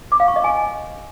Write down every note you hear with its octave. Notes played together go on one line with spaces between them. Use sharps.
D6
F5
C#6
D#5
G#5